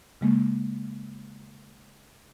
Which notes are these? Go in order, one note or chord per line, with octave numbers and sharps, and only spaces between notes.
C#3 G#3 A#3